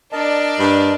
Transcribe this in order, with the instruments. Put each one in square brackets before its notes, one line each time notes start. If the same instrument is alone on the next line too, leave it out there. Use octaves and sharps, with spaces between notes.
[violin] D4 D5 [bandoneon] A#4 D#5 A5
[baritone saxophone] G2